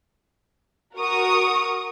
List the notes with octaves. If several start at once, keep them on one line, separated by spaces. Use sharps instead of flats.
F#4 A#4 C#6 D#6